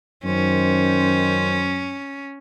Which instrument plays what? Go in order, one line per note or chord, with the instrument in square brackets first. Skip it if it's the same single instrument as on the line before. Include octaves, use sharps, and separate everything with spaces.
[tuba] F#2 [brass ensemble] D#3 C5 [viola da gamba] C#4